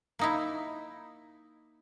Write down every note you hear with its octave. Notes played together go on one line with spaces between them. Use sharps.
A#3 D#4 E4